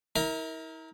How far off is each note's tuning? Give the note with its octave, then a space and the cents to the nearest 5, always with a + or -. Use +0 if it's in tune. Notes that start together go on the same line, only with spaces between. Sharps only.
E4 -40 A#4 +0